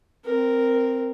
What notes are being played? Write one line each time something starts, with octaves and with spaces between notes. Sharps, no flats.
C4 A#4